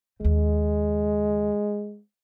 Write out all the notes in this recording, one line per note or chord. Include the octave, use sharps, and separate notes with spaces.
D#2 C#3 G#3